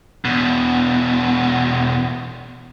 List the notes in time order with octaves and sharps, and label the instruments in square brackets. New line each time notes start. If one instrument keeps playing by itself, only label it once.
[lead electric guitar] E2 B2